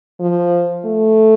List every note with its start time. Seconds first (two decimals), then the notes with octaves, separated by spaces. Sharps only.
0.20 F3
0.85 A3